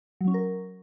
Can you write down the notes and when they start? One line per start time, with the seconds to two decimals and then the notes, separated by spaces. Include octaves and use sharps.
0.21 F#3
0.27 C#4
0.34 A#4